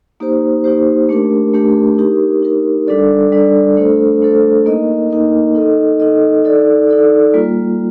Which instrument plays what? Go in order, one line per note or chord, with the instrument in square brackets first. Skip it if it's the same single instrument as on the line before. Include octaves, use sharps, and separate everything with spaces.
[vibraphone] A#3 D#4 G4 C5
A#3 D#4 G4 C5
A3 D4 G4 A#4
A3 D4 G4 A#4
D#4 G4 A#4
D#4 G4 A#4
G3 D4 A4 D5
G3 D4 A4 D5
A3 D4 A4 C5
A3 D4 A4 C5
A#3 D#4 A#4 D#5
A#3 D#4 A#4 D#5
D#4 A4 D#5
D#4 A4 D#5
D#4 A4 D5
D#4 A4 D5
G3 A#3 F4